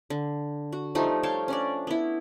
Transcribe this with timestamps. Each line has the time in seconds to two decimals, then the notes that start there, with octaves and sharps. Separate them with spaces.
0.10 D3
0.73 F#4
0.95 F3 G3 A3 D#4
1.23 C#5 F5 G5 A5
1.48 C#4 D4 D5
1.87 B3 E4